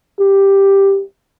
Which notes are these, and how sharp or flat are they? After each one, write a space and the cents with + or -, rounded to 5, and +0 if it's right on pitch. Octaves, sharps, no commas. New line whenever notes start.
G4 +5